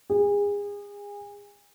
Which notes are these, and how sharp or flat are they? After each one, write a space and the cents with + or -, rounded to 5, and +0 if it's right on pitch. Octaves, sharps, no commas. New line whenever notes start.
G#4 -30